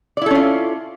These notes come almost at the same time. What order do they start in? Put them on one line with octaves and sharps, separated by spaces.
D5 E4 A4 C#4 F4